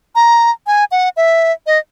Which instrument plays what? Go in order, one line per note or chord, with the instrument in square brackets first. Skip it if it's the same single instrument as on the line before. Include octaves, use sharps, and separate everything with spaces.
[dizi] A#5
G#5
F#5
E5
D#5